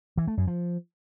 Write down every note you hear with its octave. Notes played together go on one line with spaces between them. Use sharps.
E3
A3
F#2
F3